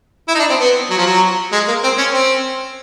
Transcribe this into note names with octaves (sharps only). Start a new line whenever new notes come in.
E4
D#4
D4
C4
B3
F#3
F3
F#3
G#3
A#3
C4
C#4
C4